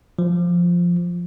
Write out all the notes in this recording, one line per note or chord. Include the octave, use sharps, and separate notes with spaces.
F3